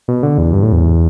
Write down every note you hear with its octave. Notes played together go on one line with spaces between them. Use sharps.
B2
D3
E2
G2
A2
E2